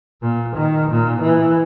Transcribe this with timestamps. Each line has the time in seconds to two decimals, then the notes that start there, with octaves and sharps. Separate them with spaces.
0.22 A#2
0.56 D#3
0.91 A#2
1.21 E3